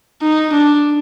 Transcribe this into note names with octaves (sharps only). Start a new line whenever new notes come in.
D#4
D4